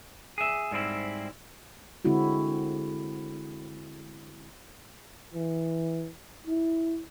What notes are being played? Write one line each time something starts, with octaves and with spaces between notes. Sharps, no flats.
G#4 E5
G#2 G3 G#3 C4 E4
D3 G#3 C4 E4 F#4
E3
E4